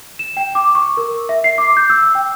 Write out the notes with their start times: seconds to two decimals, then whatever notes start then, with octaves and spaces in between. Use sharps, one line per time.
0.19 E7
0.37 G5
0.55 D6
0.75 C#6
0.97 A#4
1.29 E5
1.44 C7
1.58 D6
1.77 G6
1.90 E6
2.15 G5